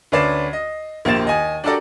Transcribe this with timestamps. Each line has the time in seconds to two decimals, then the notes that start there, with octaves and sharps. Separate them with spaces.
0.12 D2 C#4 B4 D5 C7 E7
0.53 D#5
1.05 A#1 A#3 G4 C5 A6 E7
1.25 D#2 D#5 G#5
1.64 D4 F#4 G4 A4 A#4 D5